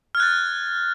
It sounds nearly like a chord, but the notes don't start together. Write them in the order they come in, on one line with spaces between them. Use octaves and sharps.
F6 G#6 F#6 A6